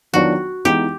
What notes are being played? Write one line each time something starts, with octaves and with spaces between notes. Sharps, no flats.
D#3 F#3 B3 D4 F4 F#4
E3 G#3 B3 D#4 G4